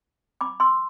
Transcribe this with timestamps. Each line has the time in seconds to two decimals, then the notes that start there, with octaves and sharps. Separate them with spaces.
0.41 B5 D6
0.60 C6 E6